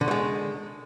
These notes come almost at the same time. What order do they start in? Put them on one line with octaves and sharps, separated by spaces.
D3 D#3 A3 G#3